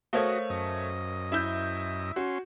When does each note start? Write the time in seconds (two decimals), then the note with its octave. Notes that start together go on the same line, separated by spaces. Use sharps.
0.13 A3 F#4 A#4 C5 C#5 D#5 F5
0.50 F#2 D#5
1.32 E4 E5 G6
2.16 C#4 F#4 C6